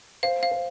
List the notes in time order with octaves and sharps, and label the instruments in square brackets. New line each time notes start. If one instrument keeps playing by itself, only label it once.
[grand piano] C5 [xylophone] F5
[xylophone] F5
[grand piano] C5